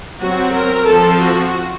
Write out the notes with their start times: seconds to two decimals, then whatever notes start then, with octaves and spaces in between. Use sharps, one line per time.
0.20 F#3 C4 F#4
0.54 A#4
0.87 F3 C4 A4
1.21 F#4